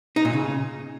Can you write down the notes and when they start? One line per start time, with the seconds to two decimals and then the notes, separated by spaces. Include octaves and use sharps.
0.16 D#4
0.25 A#2
0.33 C#3